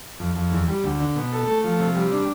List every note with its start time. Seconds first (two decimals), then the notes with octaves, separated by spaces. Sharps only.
0.19 F2
0.35 F2
0.51 E2
0.68 G3
0.84 D2
1.00 D3
1.16 B2
1.32 A4
1.47 A3
1.64 F3
1.80 C3
1.95 G3
2.12 D4